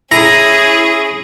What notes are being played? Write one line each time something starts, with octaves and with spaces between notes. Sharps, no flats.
C#4 E4 G#4 A#5